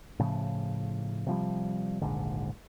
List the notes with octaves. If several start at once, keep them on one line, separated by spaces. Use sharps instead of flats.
A2 C#3 F3
C3 F3 G3
D#1 A#1 G#2 D3